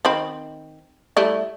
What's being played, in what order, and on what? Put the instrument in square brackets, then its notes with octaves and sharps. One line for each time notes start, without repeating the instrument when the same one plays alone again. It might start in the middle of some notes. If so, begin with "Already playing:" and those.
[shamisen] D#3 C4 B5
G3 A3 E4